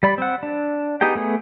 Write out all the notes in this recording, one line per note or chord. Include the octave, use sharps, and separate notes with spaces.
G3 D5 B5
C4 F#5
D4
B3 D#4 G4 G#4 G5
A3 B3 G#4